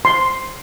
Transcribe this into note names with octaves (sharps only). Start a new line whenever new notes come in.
C6